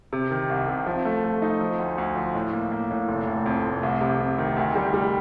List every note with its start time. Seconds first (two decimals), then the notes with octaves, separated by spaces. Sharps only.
0.13 C3
0.31 D#3
0.49 C2
0.69 C3
0.87 F3
1.05 A3
1.24 A3
1.42 D#4
1.61 F3
1.79 D2
1.98 D2
2.16 F3
2.35 A2
2.53 A#3
2.72 A#3
2.91 A2
3.09 F1
3.27 F1
3.46 F2
3.64 F1
3.83 C2
4.01 C3
4.20 C3
4.38 D#3
4.57 D2
4.76 G3
4.94 G3